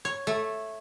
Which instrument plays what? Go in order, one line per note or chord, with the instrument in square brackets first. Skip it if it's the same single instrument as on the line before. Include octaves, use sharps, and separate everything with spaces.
[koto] C#5
A3